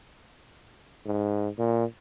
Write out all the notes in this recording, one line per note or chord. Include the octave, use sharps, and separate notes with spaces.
G#2
A#2